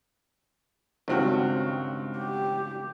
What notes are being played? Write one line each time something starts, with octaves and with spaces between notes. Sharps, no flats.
C#2 G2 D#3 C4 F#4
G4